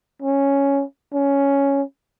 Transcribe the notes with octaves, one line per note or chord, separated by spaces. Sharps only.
C#4
C#4